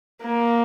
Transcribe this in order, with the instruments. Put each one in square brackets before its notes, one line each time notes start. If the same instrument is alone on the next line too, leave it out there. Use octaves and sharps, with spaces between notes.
[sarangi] A#3